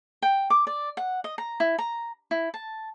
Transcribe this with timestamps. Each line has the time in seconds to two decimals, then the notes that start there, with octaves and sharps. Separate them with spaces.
0.22 G5
0.50 D6
0.67 D5
0.97 F#5
1.24 D#5
1.38 A#5
1.60 E4
1.78 A#5
2.31 E4
2.54 A5